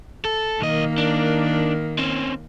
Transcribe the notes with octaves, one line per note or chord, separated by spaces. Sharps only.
A4
B1 D#3 A#3 D#5
D4
C4 C#4